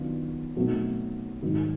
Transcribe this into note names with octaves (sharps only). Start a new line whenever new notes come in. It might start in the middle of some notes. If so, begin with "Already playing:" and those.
Already playing: D#3 F#3 B3 D4 F4
B2 F#3 A3 C4 D#4
G#2 D#3 F#3